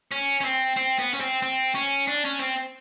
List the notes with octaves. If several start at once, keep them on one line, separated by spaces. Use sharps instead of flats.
C#4
C#4
C4
C4
B3
C#4
C4
C4
C#4
D4
C#4
C4